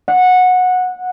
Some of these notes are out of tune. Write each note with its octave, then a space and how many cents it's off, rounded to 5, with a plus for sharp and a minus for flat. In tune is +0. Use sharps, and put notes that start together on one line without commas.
F#5 -15